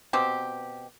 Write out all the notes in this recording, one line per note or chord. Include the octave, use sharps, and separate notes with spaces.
B2 C4 G4